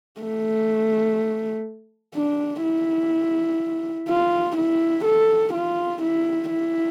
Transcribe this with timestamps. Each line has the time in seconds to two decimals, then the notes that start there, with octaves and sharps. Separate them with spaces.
0.21 A3
2.15 D4
2.63 E4
4.09 F4
4.57 E4
5.05 A4
5.54 F4
6.02 E4
6.50 E4